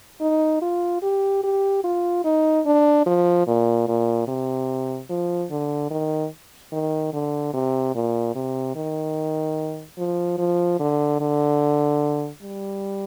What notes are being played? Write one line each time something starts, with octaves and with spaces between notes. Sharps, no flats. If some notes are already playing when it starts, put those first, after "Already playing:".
D#4
F4
G4
G4
F4
D#4
D4
F3
A#2
A#2
C3
F3
D3
D#3
D#3
D3
C3
A#2
C3
D#3
F3
F3
D3
D3
G3